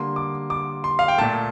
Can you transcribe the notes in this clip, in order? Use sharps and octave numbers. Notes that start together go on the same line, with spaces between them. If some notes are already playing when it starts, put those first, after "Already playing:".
Already playing: D3 G3 A#3 C6
D6
D6
C6
F5
G5
A#2 A3 A5